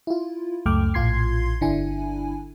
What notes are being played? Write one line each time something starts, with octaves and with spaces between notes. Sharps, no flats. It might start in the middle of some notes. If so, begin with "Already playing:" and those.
E4 F4
C#2 F#2 A3 G5 D6 F6
A#1 A2 F4 C6 G#6 C7
G1 D3 D4 E4 G#5